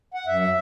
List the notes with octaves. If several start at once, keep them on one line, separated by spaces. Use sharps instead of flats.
F#5
F#2 E5